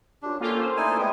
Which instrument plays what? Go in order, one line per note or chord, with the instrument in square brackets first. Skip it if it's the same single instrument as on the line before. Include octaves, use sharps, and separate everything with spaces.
[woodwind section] F#2 F4 G4 [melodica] D4
[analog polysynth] A#3 F4 G4 [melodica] C#4 [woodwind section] A4
[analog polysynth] C5
[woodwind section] F2 A3 D5 [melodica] D#4 E4 G#5
[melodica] G#3 B3 [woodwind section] E4 B4 G5